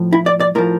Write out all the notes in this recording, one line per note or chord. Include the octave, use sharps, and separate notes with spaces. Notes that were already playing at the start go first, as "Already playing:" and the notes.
Already playing: A2 F3
E4
D5
D5
A2 F3 A#4